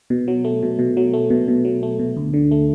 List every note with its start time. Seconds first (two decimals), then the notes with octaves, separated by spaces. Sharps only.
0.10 B2
0.28 F#3
0.45 A3
0.63 B2
0.79 B2
0.97 F#3
1.13 A3
1.30 B2
1.48 B2
1.65 F#3
1.83 A3
1.99 B2
2.17 D2
2.34 D3
2.51 A3